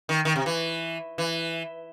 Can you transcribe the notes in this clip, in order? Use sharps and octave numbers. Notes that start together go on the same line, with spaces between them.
D#3
D#3
C3
E3
E3